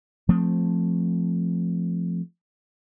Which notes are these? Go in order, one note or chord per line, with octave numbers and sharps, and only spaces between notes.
F3 A3 C4